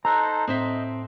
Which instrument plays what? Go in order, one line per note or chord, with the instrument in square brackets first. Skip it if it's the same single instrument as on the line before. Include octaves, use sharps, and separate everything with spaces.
[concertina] D#4 A4 C5 [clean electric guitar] A#5 [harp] E6 F#6 A#6
[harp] A2 [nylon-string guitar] C4 C5 E5 [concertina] D#5